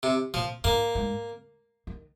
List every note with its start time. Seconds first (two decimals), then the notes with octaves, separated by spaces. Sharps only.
0.03 C3
0.34 A#2 F3
0.64 G#2 A#3
0.95 G#2
1.87 D#3